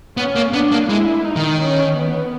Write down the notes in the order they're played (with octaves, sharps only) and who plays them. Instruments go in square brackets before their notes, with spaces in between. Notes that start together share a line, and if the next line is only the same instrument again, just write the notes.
[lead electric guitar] B3 [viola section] C#4
[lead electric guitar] A#3
[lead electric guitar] B3 [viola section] D4
[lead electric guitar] A#3
[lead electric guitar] G#3 [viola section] E4
[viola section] D#4
[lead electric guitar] D#3
[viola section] C#4
B3